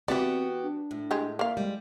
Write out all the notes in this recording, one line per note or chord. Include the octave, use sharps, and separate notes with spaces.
E3 B3 C4 F#4 G4 D5
D4
A2
G#3 G4 G#4
A#3 E5 F5
G3 G#3